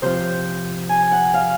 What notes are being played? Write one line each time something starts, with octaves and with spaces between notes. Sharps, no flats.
C3 F3 C5
G#5
F#5
F5